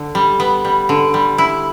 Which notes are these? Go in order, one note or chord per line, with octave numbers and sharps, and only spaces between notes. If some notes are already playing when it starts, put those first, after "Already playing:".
Already playing: D3
G3
B3
G3
D3
G3
E4